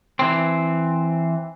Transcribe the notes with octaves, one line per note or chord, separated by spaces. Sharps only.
E3 C4